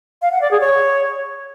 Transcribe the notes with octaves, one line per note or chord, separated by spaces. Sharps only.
F5
F#5
D5
G#4
C#5